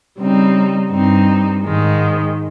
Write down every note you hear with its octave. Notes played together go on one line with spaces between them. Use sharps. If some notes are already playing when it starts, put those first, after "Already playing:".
C#3 G3 C4 D#4
G2 G3 C4 D#4
G#2 D#3 G#3